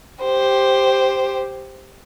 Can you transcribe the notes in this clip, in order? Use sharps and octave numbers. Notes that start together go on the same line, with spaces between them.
G4 C5